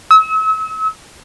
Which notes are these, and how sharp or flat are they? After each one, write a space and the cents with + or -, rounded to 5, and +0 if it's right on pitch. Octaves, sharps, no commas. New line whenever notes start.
E6 -40